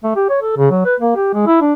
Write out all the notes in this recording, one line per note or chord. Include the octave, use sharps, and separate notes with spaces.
A3
G4
C#5
A4
C#3
F#3
B4
A#3
G4
G#3
E4
D4